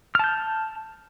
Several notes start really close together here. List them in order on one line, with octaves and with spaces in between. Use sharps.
F6 A5 G6